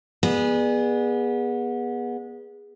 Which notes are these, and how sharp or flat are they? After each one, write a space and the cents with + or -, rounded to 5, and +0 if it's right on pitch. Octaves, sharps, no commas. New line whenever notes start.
B3 -25 G#4 -15 D5 +30